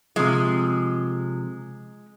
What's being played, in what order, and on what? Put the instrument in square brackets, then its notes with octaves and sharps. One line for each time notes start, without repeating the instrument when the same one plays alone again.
[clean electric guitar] C3 F3 [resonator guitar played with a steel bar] G#3